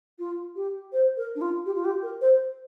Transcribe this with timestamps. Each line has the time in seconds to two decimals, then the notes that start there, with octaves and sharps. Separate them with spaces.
0.19 F4
0.55 G4
0.92 C5
1.17 A#4
1.35 D4
1.41 F4
1.65 G4
1.75 F4
1.85 G4
2.02 A#4
2.21 C5